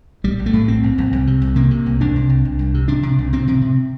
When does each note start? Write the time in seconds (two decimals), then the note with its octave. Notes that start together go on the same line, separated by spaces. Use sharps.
0.24 A#1 G3
0.39 A#1
0.46 A3
0.53 A2
0.68 A#1 C4
0.83 A#1
0.98 A#1
1.13 C2
1.27 C3
1.41 C2
1.56 C3 A#3
1.71 C3
1.86 C2
2.01 C2 D4
2.16 C3
2.29 C2
2.45 C2
2.59 C2
2.74 C3
2.88 C3 D4
3.03 C3
3.18 C2
3.33 C3 C4
3.48 C3
3.61 C3